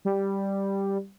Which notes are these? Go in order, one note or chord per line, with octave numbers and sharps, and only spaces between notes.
G3